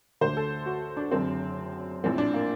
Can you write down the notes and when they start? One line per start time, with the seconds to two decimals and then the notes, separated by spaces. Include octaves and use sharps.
0.21 D2 D3 C5
0.37 A4
0.66 F#4
0.97 D4
1.11 F#1 F#2 D3 C4
2.03 A#1 A2 C4
2.18 D4
2.34 A#3